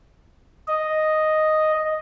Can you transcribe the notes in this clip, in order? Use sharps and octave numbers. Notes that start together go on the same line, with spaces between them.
D#5